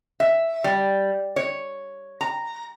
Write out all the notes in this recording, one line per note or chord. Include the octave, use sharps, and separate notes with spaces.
E5
G3
C#5
A#5